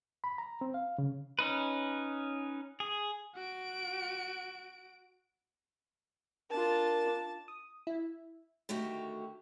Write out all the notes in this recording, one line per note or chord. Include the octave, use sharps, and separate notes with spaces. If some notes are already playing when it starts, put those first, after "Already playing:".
B5
A#5
C4
F5
C#3
C#4 D#4 B4
G#4
F#4 D7
D4 F4 A#4 A5
D#6
E4
D3 D#3 A3 F#4 G4